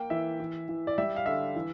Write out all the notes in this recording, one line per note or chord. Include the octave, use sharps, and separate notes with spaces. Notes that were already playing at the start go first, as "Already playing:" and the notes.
Already playing: A#3 G5
E3 E5
E3
E3
D5
G3 E5
F5
D3 E5
E3